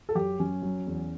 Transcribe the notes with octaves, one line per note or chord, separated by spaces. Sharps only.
A4
F#2 G4
F#2 C#4
F#3
E2